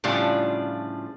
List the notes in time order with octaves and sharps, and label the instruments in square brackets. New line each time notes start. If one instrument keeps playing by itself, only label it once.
[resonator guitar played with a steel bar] A2 C#3 F3 G3 D4 F4